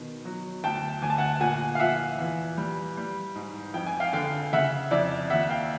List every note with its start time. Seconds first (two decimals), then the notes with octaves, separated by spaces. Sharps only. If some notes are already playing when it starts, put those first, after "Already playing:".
Already playing: B2 D#3
0.25 F#3
0.64 D2 G5 A5
1.02 D2 G#5
1.10 A5
1.18 F#5 G#5
1.40 A#2 F#5 G#5
1.75 F5
1.79 F3 E5 F#5
2.18 E2
2.57 G3
2.97 G3
3.35 G#2
3.74 F2 G5
3.86 G#5
4.00 F5 G5
4.13 D3 F5 G5
4.53 C#3 E5 F#5
4.91 F2 D5 E5
5.30 D#2 E5 F#5
5.49 F5 G5